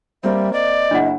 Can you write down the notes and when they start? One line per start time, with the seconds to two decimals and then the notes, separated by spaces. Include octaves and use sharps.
0.23 G3 A#3 C4 E5
0.53 D5 D#5
0.91 F#1 D4 E4 F#5